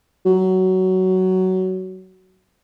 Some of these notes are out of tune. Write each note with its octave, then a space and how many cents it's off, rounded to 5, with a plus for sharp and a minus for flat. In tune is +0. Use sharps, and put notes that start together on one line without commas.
F#3 +15